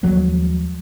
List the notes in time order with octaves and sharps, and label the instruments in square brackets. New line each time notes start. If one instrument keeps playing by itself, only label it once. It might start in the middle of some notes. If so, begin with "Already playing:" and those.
[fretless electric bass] D#2 F3 F#3 G#3